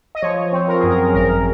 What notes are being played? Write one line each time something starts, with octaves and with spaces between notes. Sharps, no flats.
D#5
F3 C#5
C4
A#4
F#2 G#4
A#4
G#1 A#4